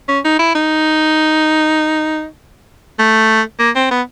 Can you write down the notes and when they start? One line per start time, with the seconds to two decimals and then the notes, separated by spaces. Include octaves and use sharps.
0.08 C#4
0.24 D#4
0.39 E4
0.55 D#4
2.99 A3
3.59 A#3
3.75 C4
3.91 B3